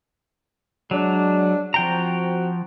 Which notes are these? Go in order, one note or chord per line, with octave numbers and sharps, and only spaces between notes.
F#3 G#3 D4
F3 C4 F#4 G5 A#5